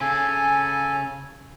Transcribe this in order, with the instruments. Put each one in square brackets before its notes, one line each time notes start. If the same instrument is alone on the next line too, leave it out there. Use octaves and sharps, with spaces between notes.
[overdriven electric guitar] C#3 [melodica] A4 G#5